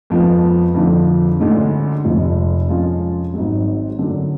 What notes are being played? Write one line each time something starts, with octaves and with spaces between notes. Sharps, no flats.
F2 F3 G#3 B3
F2 D3 F3
D2 D3 G#3 C#4
F1 F2 F3 G#3
F2 F3 G#3 C#4 F4
G#1 G#2 F#3
F#2 D3 F#3